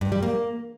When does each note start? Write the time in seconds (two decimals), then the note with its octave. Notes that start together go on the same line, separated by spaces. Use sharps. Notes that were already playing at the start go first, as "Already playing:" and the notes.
0.01 G2
0.12 G3
0.22 A#3